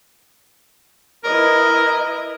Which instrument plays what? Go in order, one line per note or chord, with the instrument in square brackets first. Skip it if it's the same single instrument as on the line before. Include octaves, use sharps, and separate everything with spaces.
[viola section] E4 B4 D#5 [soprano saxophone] A#4